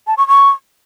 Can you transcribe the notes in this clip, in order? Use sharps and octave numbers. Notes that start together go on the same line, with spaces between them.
A5
C#6
C#6